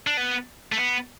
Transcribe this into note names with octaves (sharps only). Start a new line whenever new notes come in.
D4
B3
A3
B3